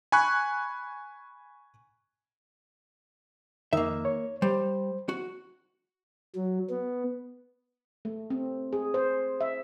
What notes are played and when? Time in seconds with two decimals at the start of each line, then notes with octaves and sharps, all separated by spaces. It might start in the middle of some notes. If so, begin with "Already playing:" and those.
0.12 G#5 B5 C#6 F#6
3.73 F2 D#3 A#3 D#4 E5
4.05 C#5
4.42 G3 C5
5.09 F#4
6.35 F#3
6.70 B3
8.05 A3
8.30 C4
8.73 G#4
8.94 C5
9.41 E5